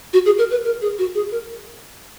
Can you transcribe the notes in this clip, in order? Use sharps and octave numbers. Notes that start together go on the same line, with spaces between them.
F#4
G#4
A#4
B4
A#4
G#4
F#4
G#4
A#4